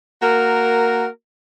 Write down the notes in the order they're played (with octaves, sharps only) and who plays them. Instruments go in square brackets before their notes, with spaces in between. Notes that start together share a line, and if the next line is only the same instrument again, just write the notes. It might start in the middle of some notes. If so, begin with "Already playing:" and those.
[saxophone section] A#3 F#4 A#4